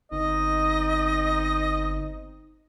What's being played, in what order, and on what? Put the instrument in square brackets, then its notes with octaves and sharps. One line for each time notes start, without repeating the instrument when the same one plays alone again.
[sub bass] G1 [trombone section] C4 D#4 [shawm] D#5